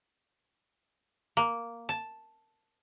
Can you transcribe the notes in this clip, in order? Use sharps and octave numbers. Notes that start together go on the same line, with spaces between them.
A#3
A5